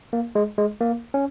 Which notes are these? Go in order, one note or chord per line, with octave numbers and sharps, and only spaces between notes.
A#3
G#3
G#3
A#3
C#4